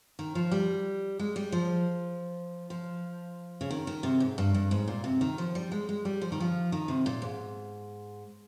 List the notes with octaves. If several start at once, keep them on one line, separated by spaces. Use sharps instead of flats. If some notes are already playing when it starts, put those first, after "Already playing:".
D#3
F3
G3
G#3
G3
F3
F3
C#3
D#3
D#3
C3
G#2
G2
G2
G#2
A#2
C3
D#3
F3
G3
G#3
G#3
G3
F3
D#3
F3
D#3
C3
A#2
G#2